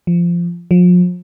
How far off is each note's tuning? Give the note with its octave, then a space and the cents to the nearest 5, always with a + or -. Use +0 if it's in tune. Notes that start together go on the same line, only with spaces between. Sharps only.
F3 -15
F3 +35